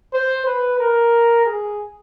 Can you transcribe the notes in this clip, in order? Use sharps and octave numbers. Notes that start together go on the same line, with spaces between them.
C5
B4
A#4
G#4